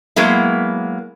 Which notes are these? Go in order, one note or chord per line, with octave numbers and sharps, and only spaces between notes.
F#3 G#3 A#3 B3 E4